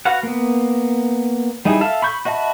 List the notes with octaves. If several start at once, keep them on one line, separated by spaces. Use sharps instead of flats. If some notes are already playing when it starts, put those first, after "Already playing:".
F#4 B4 F5 F#5
A#3 B3
G3 D#4 E4 G#4
A4 E5 F5
B5 C#6 G6
F#4 D#5 E5 A5 B5